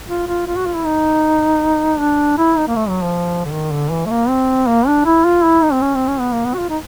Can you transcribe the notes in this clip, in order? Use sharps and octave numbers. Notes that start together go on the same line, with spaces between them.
F4
F4
F4
F#4
F4
E4
D#4
D4
E4
D#4
A#3
A3
F#3
F3
D3
D#3
D3
E3
A3
A#3
C4
A#3
D4
E4
F4
E4
D#4
C4
C#4
C4
C#4
B3
A#3
B3
F#4
F4
D#4